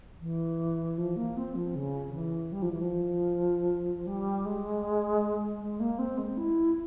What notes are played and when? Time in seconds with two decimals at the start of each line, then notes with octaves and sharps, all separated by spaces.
0.20 E3
0.98 F3
1.16 A#3
1.37 C4
1.55 F3
1.75 C#3
2.14 E3
2.52 G3
2.62 F3
2.71 E3
2.81 F3
4.07 G3
4.45 G#3
5.60 G#3
5.80 A#3
5.99 C4
6.18 G#3
6.37 E4